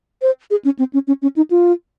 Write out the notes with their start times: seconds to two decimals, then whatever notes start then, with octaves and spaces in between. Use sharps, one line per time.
0.22 C5
0.51 G#4
0.65 C#4
0.79 C4
0.93 C#4
1.07 C#4
1.22 C#4
1.36 D#4
1.51 F4